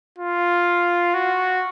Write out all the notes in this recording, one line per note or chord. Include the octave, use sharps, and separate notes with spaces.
F4
F#4